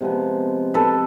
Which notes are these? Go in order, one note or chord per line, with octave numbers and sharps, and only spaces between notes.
C3 F3 G#3 B3
A4 B4